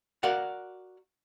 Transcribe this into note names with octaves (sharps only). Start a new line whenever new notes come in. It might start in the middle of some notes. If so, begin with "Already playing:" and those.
F#4 A#4 D5 F5 F#5